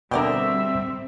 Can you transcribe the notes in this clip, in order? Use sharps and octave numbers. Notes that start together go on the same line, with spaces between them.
B2 D3 G3 C4 A#4 D5 E5 G5